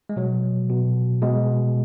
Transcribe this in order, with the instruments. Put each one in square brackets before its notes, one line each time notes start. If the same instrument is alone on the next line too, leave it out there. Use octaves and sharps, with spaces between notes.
[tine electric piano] G#3
B2 F#3
B2
B2 G#3